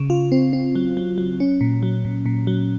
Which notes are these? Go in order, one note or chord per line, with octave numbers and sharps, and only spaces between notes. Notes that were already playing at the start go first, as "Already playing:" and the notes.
Already playing: C#3
F4
C4
C4
F#3
F#3
F#3
C#4
A#2
F#3
A#2
A#2
F#3